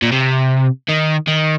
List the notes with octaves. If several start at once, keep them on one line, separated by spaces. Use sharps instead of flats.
A#2
C3
D#3
D#3